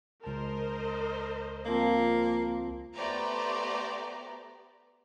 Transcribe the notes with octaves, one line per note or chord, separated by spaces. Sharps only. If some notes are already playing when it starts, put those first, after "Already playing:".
C#2 A#4 C5 D#5 A5
F3 A#3 C4 F5
A3 B3 G4 C5 D5 A#5